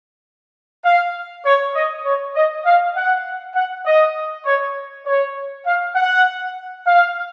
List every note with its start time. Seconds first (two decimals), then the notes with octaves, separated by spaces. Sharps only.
0.85 F5
1.45 C#5
1.75 D#5
2.05 C#5
2.35 D#5
2.65 F5
2.96 F#5
3.55 F#5
3.86 D#5
4.45 C#5
5.06 C#5
5.66 F5
5.95 F#5
6.87 F5